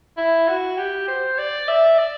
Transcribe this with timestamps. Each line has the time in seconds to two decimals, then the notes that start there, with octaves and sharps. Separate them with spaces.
0.17 E4
0.48 F#4
0.78 G4
1.08 C5
1.38 D5
1.68 E5
1.98 D5